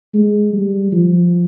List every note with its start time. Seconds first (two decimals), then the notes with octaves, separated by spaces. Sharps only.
0.14 G#3
0.53 G3
0.92 F3